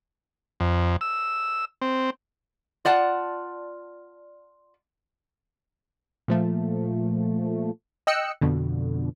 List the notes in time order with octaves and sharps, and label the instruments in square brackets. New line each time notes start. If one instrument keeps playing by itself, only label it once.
[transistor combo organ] F2
E6
C4
[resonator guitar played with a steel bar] F4 D5 F#5 A5
[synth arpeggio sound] A#2 F3 A3
D#5 G5 E6 F#6 C#7
F2 B2 D3